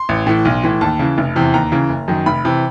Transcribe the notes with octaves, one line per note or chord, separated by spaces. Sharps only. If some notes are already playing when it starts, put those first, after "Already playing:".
Already playing: C6
A1
A2 E3
B1
A2 E3
D#2 A5
C#3 E3
F1
E2 C3 E3
D#2 A#5
C#3 E3
F#1
F#2 D#3
F1 B5
C3 E3